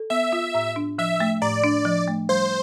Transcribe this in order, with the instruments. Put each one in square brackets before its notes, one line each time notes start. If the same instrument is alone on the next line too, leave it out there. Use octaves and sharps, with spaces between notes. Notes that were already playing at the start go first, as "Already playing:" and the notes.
Already playing: [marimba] A4
[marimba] B3 [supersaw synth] E5
[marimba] F4
A2
D4
[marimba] F3 [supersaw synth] E5
[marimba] A3
[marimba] A2 [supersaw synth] D5
[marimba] D4
F3
A3
[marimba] G3 [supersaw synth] C5